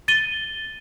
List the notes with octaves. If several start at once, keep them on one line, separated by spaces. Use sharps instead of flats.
A6 D#7 G7